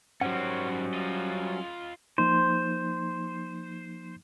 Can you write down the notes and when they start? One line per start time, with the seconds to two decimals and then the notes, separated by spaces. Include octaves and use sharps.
0.21 G#2 F#3 G3 C4 C#4 C5 F#5
0.94 F4 D#5
2.18 F3 A#3 D#4 C5